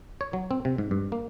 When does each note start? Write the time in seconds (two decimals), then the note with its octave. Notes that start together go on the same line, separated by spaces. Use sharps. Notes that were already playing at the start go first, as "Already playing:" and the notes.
0.21 C#5
0.33 F#3
0.51 C4
0.65 C3
0.78 G#2
0.91 G2
1.12 A#3